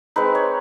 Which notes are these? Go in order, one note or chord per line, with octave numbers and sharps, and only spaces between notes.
G#3 C4 D#4 B4
C#5